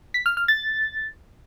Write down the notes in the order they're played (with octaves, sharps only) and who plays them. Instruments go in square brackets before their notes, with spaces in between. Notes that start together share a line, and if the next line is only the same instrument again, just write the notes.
[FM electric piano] B6
F6
F6
A6